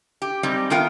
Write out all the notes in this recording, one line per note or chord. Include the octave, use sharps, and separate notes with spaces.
G4
G3 G#3 C4 D#4
D#3 A3 B3 F4 A#4 G5